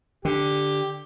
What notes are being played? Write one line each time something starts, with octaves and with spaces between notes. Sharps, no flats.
D3 G4